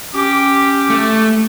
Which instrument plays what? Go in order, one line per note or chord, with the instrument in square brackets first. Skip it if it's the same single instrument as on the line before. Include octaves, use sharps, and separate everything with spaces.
[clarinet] C#4 [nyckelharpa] G4 [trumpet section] D6
[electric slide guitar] A3